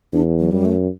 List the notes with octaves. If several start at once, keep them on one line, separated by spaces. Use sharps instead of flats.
E2 D4
F#3
F#2 G3
A3